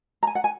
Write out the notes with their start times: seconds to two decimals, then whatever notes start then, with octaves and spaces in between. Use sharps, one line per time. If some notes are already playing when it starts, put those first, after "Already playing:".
0.23 A#5
0.27 G#5
0.35 F#5
0.44 G#5